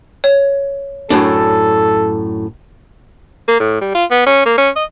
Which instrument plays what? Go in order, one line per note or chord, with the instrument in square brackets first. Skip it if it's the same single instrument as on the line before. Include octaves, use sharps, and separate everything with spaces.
[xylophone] C#5
[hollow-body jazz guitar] F#2 A2 D4 [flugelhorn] A4
[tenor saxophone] A#3
A2
G3
F4
B3
C#4
A#3
C#4
D#5